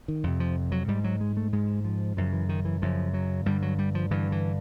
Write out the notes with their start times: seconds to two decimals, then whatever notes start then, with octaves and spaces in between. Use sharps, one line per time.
0.08 D#3
0.24 F2 C3
0.40 F3
0.72 F#3
0.88 G#2 G3
1.04 F#3
1.21 G#3
1.37 A3
1.53 G#2 G#3
1.85 F3
2.17 F#2 C#3 F3
2.33 E3
2.49 D#3
2.65 E3
2.82 F#2 C#3 F3
3.14 F#3
3.46 G2 D3 G3
3.62 F#3
3.79 G3
3.95 F3
4.11 G2 D3 E3
4.32 E3